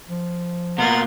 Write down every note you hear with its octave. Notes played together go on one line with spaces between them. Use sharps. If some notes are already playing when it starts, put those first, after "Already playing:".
F3
B2 A#3 F4 F#5 A#5